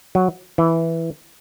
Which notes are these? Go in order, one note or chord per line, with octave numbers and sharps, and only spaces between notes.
F#3
E3